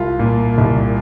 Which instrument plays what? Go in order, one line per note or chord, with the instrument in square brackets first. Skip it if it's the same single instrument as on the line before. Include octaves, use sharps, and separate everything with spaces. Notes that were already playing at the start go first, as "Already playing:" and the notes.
Already playing: [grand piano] C2 F4
A#2
C2